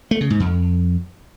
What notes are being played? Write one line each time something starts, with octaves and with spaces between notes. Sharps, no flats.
A3
C#3
G#2
F2